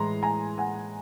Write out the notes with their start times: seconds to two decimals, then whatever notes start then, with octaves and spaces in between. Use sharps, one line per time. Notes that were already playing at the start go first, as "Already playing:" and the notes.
Already playing: A2 E3 G#3 A#5 C6
0.23 G#5 A#5
0.58 F#5 G#5